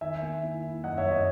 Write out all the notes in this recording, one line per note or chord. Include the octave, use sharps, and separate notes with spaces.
D#3 E5 G#5
A#3
E4
E4
F#2 D#5 F#5
C#5 E5
F#2
D#5